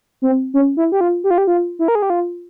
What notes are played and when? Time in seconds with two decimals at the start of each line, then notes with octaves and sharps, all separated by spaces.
0.22 C4
0.54 C#4
0.77 E4
0.92 G4
1.01 F4
1.24 G4
1.31 F4
1.38 G4
1.47 F4
1.79 E4
1.88 A#4
1.95 G#4
2.02 G4
2.10 F4